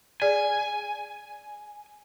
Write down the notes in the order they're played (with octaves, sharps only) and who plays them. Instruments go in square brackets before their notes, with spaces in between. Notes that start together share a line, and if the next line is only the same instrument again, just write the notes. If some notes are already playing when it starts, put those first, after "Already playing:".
[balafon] G#4 D5 [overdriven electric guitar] G#5